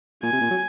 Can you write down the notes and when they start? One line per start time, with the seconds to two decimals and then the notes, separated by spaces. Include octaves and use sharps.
0.23 A#2 G#5
0.33 C3
0.41 A#2
0.50 F#3